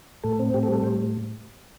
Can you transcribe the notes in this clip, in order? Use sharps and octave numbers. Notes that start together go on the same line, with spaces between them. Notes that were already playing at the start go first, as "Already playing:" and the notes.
A2 A4
C4
A2 G4
A4
G3
A4
A2 C5